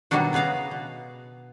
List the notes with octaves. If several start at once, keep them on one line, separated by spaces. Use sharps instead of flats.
B2 D#3 F#3 G3 D4 F#4
C#3 B3 G#4 F5 A#5
B2